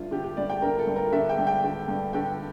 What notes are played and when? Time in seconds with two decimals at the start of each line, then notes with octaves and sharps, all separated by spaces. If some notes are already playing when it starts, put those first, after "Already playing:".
Already playing: G2 D3 E4 F4
0.11 D3 G4
0.24 G4
0.37 G2 D5
0.50 G5
0.62 D3 A#4
0.79 A4
0.87 G2
0.96 A#4
1.13 D3 E5
1.29 G5
1.38 G2
1.47 G5
1.64 D3
1.88 G2
2.13 D3 G5